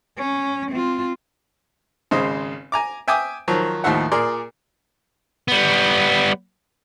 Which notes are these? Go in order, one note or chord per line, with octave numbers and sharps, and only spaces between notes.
C#4
C4 F4
G#1 C#3 G#3 C5 D#5
G#5 A#5 D6
E5 G5 G#5 D6 D#6
D#3 F3 F#3
D#2 A2 F3 D#4 E5 F#5
A#2 G#4 A#4 D5 C6
G3 B3